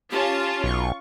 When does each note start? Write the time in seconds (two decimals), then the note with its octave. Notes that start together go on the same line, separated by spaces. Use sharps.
0.11 C#4 F4 G4 A5
0.64 B1 C#6